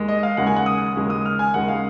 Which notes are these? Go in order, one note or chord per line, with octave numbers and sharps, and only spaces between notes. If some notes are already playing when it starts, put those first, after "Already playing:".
Already playing: D#2 G#3
D#5
F5
D#2 C#3 G#3 F#5
G#5
F#5
D#6
D#2 C#3 G#3
D#6
F6
G#5
D#2 C#3 G#3 F#5
F5